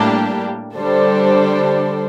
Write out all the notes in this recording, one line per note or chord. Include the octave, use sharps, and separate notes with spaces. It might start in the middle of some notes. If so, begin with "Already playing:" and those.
Already playing: A2 G3 A#3 D4 G4
D3 G3 D4 A4 C5